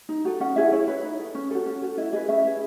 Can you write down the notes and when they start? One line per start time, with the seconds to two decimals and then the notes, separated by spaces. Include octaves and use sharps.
0.09 D#4
0.25 F#4 A4
0.40 C#4 F#5
0.56 E4 G#4 E5
0.72 E4 C#5
0.88 B4
1.03 D#4
1.19 A4
1.35 C#4
1.51 F#4 A4
1.66 C#4
1.82 F#4 A4
1.98 E4 D#5
2.13 G#4 B4 D#5
2.29 C#4 E5
2.45 G#4 B4